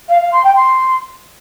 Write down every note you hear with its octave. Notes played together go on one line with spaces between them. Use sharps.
F5
F5
C6
G5
C6